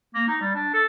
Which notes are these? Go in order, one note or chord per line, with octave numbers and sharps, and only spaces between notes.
A#3
D#4
G3
D4
A4